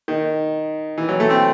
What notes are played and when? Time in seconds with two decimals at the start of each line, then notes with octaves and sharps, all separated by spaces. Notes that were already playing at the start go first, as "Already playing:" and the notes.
0.08 D#3
0.98 E3
1.09 F#3
1.20 A3
1.30 C4